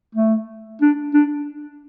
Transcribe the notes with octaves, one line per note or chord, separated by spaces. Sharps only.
A3
D4
D4